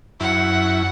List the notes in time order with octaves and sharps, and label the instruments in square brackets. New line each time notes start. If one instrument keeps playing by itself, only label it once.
[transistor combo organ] F#2 E4 [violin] F#5